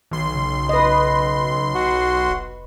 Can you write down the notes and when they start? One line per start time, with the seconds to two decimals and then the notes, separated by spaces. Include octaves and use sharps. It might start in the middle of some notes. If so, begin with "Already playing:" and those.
0.11 B1 D#3 C6
0.34 C#3
0.69 B4 D#5
1.75 F#4
2.29 F1